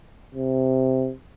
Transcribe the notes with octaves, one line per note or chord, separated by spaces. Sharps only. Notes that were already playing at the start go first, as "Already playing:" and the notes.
C3